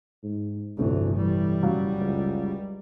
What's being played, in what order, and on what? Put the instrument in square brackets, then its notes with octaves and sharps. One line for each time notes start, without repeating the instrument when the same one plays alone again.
[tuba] G#2
[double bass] G1 E3 [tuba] D2 [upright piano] A2 C3
[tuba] E3 [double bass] G3
[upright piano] F#1 F#3 F5
[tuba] C#2